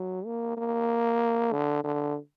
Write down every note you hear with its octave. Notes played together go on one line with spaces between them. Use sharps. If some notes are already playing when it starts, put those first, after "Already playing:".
Already playing: F#3
A#3
A#3
D3
D3